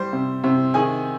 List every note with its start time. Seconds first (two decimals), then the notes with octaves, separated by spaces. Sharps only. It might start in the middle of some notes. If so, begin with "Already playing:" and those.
Already playing: G3 C5
0.13 C3
0.44 C3
0.74 D#3 G#4 G#5